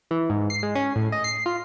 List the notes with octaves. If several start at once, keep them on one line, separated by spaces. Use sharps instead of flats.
E3
G#2
C7
G#3
C#4
A2
D#5
C7
F4